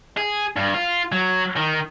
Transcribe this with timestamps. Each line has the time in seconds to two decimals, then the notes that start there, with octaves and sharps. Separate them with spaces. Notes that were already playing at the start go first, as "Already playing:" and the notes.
0.17 G#4
0.57 G2
0.74 F4
1.12 F#3
1.57 D#3